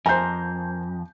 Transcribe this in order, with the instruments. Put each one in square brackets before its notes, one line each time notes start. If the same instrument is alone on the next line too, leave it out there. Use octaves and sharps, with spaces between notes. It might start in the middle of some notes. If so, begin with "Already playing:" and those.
[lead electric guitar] F2 [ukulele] A#4 C5 [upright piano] G#5 G6